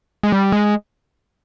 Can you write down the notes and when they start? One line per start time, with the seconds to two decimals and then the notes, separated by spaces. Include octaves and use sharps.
0.23 G#3
0.32 G3
0.52 G#3